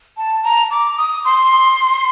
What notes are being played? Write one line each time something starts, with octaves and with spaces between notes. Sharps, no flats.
A5
A#5
D6
D#6
C6